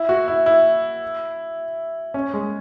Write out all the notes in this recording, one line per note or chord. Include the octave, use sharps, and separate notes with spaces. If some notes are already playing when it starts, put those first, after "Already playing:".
Already playing: E4
F#4
E4
E4
C#4
G#3